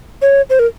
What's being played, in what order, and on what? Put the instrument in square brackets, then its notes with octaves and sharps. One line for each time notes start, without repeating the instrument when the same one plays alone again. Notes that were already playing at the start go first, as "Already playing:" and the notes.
[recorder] C#5
C5
A#4